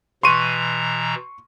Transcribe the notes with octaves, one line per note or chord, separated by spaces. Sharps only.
B2 E3 A#5 C6 C#6 D#7